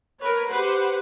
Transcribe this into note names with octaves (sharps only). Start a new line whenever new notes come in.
A#4 B4 C#5
G4 B4 C5 F#5